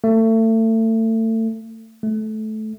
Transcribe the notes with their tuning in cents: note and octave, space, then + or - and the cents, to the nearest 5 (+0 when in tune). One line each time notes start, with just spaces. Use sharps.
A3 +30
A3 -20